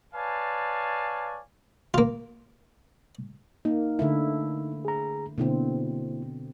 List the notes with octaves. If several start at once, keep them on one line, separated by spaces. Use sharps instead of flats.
B4 C#5 D5 F5 G#5 A5
A#3 F4
A#3 D#4
D3 A3 E4
G#4 A#5
B2 D3 A#3 C4 E4